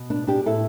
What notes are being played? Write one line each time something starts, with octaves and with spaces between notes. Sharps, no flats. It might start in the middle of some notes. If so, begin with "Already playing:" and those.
Already playing: B2
B3 D4
D4 G4
A2 E4 A4